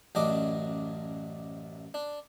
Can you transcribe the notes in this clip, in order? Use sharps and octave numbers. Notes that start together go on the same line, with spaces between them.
A1 F#2 D4 D#5 D6
D4